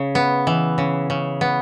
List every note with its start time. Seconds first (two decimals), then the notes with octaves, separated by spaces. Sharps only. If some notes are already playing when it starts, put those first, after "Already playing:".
Already playing: C#3
0.15 B3
0.47 E3
0.78 C#3
1.10 C#3
1.41 B3